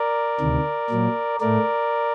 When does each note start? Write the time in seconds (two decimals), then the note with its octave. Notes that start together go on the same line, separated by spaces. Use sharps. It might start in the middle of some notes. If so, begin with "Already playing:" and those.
Already playing: A#4 D5
0.40 D2 C3 D#3
0.90 A#2 F#3 A#3
1.40 A2 A3 A#4 D5